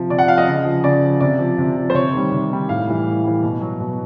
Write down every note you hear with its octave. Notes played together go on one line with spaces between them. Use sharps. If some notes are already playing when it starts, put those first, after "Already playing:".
Already playing: C3 F3
C3 D5
F#5
F3 F5
D#5
C#3
F3
C#3 D5
F3
C3 D5
F3
C3
F3
C5
C3 C#5
D#3 G3
C3
D#3 G3
A2 F5
E3 G3
A2
E3 G3
B2
F#3
B2